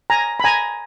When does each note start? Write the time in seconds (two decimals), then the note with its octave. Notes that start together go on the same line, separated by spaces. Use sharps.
0.10 G#5 A#5
0.40 B5
0.44 G#5 A#5